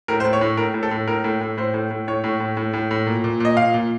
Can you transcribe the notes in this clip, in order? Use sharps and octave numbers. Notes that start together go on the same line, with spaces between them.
A2 A#4
C5
A2
C#5
A2
A2 A#4
A2
A4
A2
A2 A#4
A2
A2
A2 C5
A2
A2
A2 C#5
A2
A2
A2
A2
A2
A#2
A#2
A#2 D#5
A#2 F5
A#2